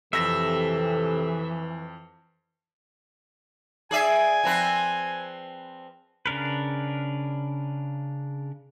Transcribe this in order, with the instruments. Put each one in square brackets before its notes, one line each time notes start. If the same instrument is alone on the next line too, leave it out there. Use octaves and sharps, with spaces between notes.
[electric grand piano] F2 A#6 E7 [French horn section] C3 G4 A4 [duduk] E3 [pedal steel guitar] E5
[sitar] G#4 D5 E5 [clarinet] G#5
[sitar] F3 C4 B4
[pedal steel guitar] C#3 D4 A#4 B4